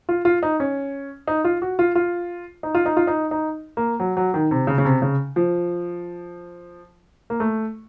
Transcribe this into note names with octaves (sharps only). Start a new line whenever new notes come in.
F4
F4
D#4
C#4
D#4
F4
F#4
F4
F4
D#4
F4
D#4
F4
D#4
D#4
A#3
F#3
F#3
D#3
C3
C#3
C#3
C3
C#3
F3
A#3
A3